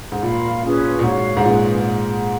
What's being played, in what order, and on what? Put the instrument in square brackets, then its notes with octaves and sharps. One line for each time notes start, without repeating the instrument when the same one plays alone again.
[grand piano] G#2
[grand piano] A#2 [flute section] F4 A#4 F5 B5
[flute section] C#4 F4 G#4 B4
[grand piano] A#2
[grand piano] G#2 [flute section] F#4 C#5 F5
[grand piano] G#2
[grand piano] A#2 [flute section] C#4 G#4 B4